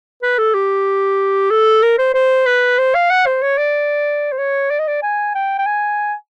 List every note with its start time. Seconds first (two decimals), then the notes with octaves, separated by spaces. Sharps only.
0.22 B4
0.38 A4
0.54 G4
1.51 A4
1.83 A#4
1.99 C5
2.14 C5
2.46 B4
2.78 C5
2.95 F5
3.10 F#5
3.27 C5
3.42 C#5
3.58 D5
4.32 C5
4.38 C#5
4.71 D5
4.79 D#5
4.88 D5
5.03 G#5
5.35 G5
5.58 G5
5.66 G#5